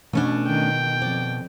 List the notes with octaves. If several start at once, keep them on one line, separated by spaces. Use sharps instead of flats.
B2 A3 C#4 D4
D#3 G5
F2 D5